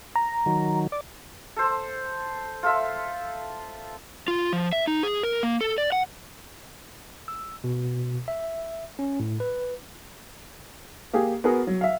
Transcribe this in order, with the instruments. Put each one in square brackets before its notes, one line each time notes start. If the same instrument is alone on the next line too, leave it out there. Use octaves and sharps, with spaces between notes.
[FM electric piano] A#5
[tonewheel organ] D#3 F#3
D5
[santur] A4 C5
F4 A4 E5
[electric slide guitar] F4
F3
E5
D#4
G#4
A#4
A#3
A4
D5
F#5
[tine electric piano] E6
B2
E5
C#4
A2
B4
[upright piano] A#3 G4 G#4
B3 F#4 G#4 A#4
F#3
E5 F5